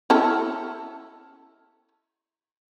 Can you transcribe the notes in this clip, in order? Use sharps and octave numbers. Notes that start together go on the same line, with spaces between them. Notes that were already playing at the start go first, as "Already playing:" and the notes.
C#4 E4 A4